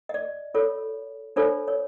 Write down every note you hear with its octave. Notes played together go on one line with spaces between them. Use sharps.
D#5
D5
F4 A4 C#5
D4 F4 A4 C5 C#5
C#5